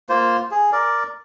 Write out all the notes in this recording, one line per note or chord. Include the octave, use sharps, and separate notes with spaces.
A#3 F4 C5
G#4
A#4 D5